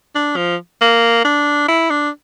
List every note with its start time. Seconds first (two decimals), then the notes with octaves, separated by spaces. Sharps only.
0.15 D4
0.36 F3
0.81 A#3
1.25 D4
1.68 E4
1.90 D4